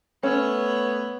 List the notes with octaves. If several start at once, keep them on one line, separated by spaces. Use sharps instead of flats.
A3 B3 C#4 C#5 E6